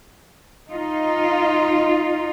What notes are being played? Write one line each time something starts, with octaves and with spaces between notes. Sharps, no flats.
D#4 F4